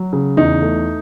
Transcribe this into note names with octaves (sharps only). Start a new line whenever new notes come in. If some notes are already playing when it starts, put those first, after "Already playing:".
Already playing: F#3
C#3
E2 D#4
A3